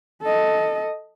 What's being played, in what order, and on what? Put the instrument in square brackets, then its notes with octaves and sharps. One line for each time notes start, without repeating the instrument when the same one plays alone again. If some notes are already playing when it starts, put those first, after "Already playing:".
[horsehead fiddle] A4 D#5